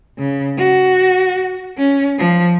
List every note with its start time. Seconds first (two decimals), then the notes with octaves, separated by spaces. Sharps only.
0.18 C#3
0.58 F#4
1.78 C#4
2.18 F3